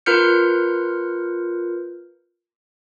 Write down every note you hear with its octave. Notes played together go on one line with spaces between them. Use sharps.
F4 A#4 B4 F6 G6 C#7